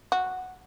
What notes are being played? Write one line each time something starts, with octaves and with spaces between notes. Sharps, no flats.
F#4